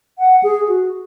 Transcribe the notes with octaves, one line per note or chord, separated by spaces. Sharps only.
F#5
G#4
F#4